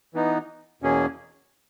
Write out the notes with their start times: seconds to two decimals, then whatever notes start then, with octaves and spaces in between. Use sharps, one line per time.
0.14 E3 B3 D#4
0.82 E2 B2 A#3 C#4 G#4